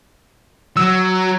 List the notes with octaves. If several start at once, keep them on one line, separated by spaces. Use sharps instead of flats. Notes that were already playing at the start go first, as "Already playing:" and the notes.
F#3 E6